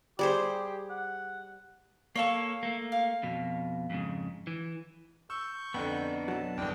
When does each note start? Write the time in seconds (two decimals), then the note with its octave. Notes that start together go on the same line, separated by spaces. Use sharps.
0.19 G3 G4 G#4 C5
0.90 F#5
2.16 A#3 A4 C#5 F5 C#6
2.63 A3 A#3
2.92 F5
3.23 F2 B2
3.90 F2 G#2 C#3
4.47 E3
5.30 C#6 E6 G6
5.74 F2 D3 B3 D4 D#4
6.28 B1 F#3 A5
6.57 G1 E2 D4 G5